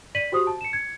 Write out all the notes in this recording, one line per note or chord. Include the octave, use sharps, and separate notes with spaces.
D5 B6 D#7 F#7
F#4 G4 C5 D#6
A5
C#7 E7
G#6 C#7